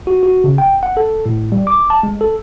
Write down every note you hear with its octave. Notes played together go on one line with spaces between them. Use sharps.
F#4
F#4
C#3
G5
F#5
A4
A2
G3
D6
A5
G#3
A4